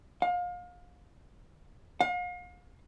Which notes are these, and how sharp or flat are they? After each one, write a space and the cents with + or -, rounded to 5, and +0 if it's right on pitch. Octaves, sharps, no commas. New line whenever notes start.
F5 +30
F5 +40